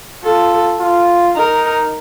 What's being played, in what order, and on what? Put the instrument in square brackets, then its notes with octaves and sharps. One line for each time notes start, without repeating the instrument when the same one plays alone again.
[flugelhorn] F4 [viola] A4
[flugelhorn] F4
[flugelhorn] D#4 [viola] A#4